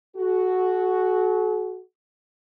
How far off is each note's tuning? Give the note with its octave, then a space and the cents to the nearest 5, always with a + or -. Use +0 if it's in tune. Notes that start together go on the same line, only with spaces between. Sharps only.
F#4 +0 A4 -45